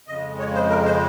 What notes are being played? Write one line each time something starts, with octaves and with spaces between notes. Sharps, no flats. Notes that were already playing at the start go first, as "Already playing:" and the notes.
F2 C#3 G#3 D#5
C#5
C5
A#4
C5